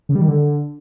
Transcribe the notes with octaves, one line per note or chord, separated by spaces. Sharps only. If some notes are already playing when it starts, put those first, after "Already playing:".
C#3
G3
D#3
D3